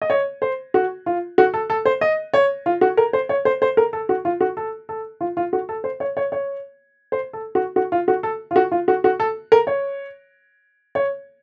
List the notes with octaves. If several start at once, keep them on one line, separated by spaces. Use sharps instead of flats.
D#5
C#5
C5
F#4
F4
F#4
A4
A4
C5
D#5
C#5
F4
F#4
A#4
C5
C#5
C5
C5
A#4
A4
F#4
F4
F#4
A4
A4
F4
F4
F#4
A4
C5
C#5
C#5
C#5
C5
A4
F#4
F#4
F4
F#4
A4
F4
F#4
F4
F#4
F#4
A4
A#4
C#5
C#5